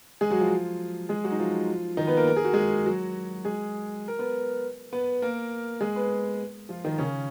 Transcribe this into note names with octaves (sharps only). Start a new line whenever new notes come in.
G#3 G#4
F#3 F#4
F3 F4
G#3 G#4
F#3 F#4
D#4
F3 F4
D#3 D#4
B3 B4
A#3 A#4
A#4
G#4
F#4
G#3 G#4
F#3 F#4
G#3 G#4
A#4
B3 B4
B3 B4
A#3 A#4
G#3 G#4
B3 B4
F3 F4
D#3 D#4
C#3 C#4